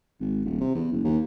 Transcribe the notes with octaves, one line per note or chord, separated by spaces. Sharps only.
G#1
D#1
C3
E2
F#1
D#2